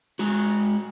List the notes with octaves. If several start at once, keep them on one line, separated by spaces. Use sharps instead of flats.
G#3 F#4